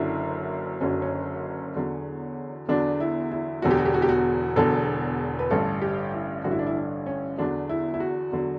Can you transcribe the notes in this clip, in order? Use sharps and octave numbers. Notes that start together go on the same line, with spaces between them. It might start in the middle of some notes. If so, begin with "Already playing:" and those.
Already playing: F#1 F#2 D3 F#3 E4
F#1 F#2 D3 F#3 C#4
C#4
E2 D3 F#3
E2 D3 F#3 D4
E4
E4
E1 E2 D3 F#3 F#4
G4
F#4
G4
F#4
G4
F#4
E1 E2 D3 F#3 A4
B4
A1 G2 D3 A4
G4
E4
A1 G2 D3 F#4
E4
D4
E4
D4
C#4
E2 D3 F#3 D4
E4
E4
F#4
E2 D3 F#3